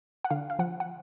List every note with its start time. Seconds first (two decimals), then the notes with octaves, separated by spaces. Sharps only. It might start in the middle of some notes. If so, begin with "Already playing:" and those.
0.24 F#5
0.30 D3 F5
0.50 F5
0.59 F3 F#5
0.80 F#5